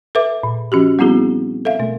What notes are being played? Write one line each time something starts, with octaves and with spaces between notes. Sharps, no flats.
A4 B4 E5 D6
A#2
F3 C#4 F#4 G4
G3 B3 C4 E4 F#4 G#4
A4 E5 F5
B2 A3